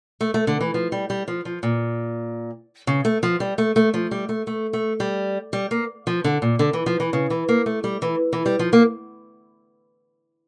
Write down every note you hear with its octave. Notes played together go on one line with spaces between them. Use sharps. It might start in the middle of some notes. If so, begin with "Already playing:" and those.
A3
A3
D3
E3
F3
G3
G3
F3
F3
A#2
C#3
A3
F3
G3
A3
A3
F3
G3
A3
A3
A3
G3
G3
A#3
F3
D3
A#2
D3
E3
F3
E3
C#3
E3
A#3
A3
G3
E3
E3
G3
F3
A#3